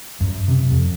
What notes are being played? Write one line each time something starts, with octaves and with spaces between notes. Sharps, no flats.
F#2
C3
F2